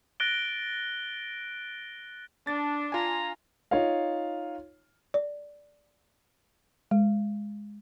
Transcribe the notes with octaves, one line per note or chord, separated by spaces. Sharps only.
F#6 A6 A#6 D7 G7
D4 A6
F4 G#5 A#5
D#4 F4 C#5 D#5 F5
D5
G#3